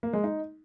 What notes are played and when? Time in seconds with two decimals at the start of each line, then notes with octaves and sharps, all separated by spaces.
0.03 A#3
0.13 G#3
0.24 D#4